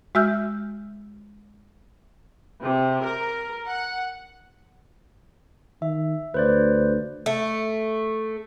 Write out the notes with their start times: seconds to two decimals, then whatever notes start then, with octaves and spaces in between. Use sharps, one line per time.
0.15 G#3 F#4 E5 E6 F6 G6
2.60 C3
3.03 A#4
3.67 F#5
5.82 D#3 E5
6.34 D2 B4 C5 D5
7.26 A3